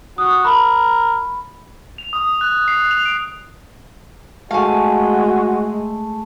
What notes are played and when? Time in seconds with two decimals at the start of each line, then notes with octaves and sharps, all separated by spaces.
0.18 F#4 D#6
0.45 A#4 B5
1.98 F7
2.13 D#6
2.41 F#6
2.68 C7
2.91 F7
3.05 D7
4.51 G#3 A3 F#4 F5 G#5